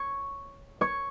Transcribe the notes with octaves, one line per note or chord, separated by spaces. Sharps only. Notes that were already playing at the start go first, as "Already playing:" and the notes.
Already playing: C#5 C#6
C#5 C#6